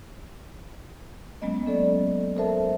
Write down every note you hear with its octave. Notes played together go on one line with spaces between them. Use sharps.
F#3 G#3 A#3 B3 C#4 D#5
C#4 A4 D5
A4 A#4 C5 E5 A5